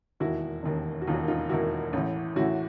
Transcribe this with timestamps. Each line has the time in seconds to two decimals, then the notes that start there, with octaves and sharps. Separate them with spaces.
0.20 E1 D#2 D#3 E4 F#4
0.63 E1 D#2 D#3
1.02 F#4
1.07 E1 D#2 D#3 D#4 F4
1.28 D#4 F4
1.49 E1 D#2 D#3 E4 F#4
1.93 A1 A2 E3
2.36 A1 A2 E3 E4 F#4